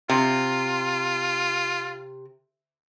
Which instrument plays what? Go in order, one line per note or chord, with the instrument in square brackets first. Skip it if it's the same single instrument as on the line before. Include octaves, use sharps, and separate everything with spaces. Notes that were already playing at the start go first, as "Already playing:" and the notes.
[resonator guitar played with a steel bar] C3 [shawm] F4